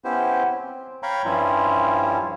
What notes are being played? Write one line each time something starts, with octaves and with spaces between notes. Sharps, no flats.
B3 C#4 E4 G4 C5
C4
C#5 F5 G5 A#5 B5 C#6
G2 F3 G3 C#4 E4 F4